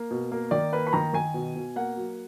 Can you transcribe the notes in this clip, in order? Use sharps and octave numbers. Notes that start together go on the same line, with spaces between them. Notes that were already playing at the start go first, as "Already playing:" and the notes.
Already playing: A#3
B2
A#3
D#3 D5
A#3 B4
B5
D#3 A#5
D#3 G#5
B2
B2
A#3 F#5
F#3